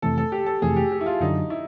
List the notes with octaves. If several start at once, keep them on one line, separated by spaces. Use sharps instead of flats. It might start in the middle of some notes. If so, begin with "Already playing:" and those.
F2 C3 E3 A3 A4
A4
G4
A4
F2 C3 E3 A3 G#4
G4
G4
E4
F4
F#2 D3 F#3 D#4
E4